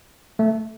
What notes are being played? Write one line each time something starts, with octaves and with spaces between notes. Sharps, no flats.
A3